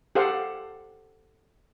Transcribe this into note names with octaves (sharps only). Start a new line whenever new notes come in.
G4 A4 C5 F5 F#5